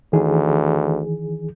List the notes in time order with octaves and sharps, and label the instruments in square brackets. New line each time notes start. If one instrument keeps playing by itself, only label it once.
[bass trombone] D2 [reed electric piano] D#3 E3 G#4